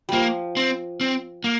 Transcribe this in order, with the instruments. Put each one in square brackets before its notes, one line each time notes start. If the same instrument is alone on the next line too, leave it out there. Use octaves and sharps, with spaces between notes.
[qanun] F3 G3 [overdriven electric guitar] A#3
[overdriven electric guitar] C4
C4
A#3